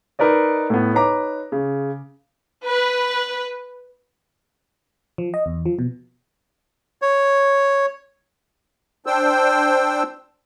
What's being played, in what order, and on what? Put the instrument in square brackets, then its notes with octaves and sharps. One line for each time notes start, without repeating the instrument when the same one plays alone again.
[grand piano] D#4 A#4 B4 D5 D#5
A2 B3
D#4 B4 C#5 A#5 D6
C#3
[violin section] B4
[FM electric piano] F3
D#5
E2
F3
B2
[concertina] C#5
[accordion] D4 C5 G5 E6